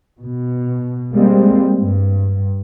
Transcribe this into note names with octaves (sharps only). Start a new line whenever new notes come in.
B2
G3 G#3 A#3 C4
G2